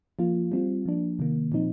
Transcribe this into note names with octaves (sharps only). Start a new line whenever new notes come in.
F3 A#3 F4
G3 C4 F4
F3 A#3 D4
C3 D#3 A#3
A#2 F3 C4 D#4